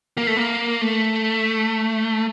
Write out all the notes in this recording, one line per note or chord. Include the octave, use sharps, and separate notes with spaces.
A#3
A3
A#3
A3